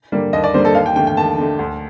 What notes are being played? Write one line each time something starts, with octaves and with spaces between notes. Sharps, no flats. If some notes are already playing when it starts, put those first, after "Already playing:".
D3 G3 A#3
D#2 D#5
D5
D3 G3 A#3 C5
A4
D#2 F5
G5
D3 A3 G5
G5
D#2 A5
D3 A3
D2